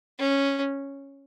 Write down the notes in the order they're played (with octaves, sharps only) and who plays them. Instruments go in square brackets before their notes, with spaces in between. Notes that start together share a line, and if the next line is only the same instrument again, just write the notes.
[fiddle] C#4